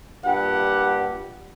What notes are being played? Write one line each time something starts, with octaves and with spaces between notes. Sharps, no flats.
G2 A#2 G4 F#5